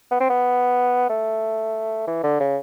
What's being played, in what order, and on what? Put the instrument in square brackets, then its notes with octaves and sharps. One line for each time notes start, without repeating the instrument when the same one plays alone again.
[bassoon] B3
C4
B3
A3
E3
D3
C#3